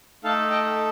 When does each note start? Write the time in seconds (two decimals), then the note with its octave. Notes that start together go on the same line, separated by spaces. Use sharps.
0.24 A3 D#4 A4 F5 A5
0.50 D#5 G5